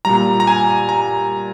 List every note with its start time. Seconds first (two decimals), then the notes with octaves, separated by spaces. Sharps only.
0.05 A#2 G3 A#5
0.40 A#5
0.47 G#5
0.89 A#5